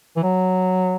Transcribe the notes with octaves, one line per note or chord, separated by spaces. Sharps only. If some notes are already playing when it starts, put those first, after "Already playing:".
E3
F#3